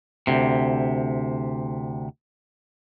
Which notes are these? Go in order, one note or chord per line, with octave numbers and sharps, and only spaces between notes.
D2 C3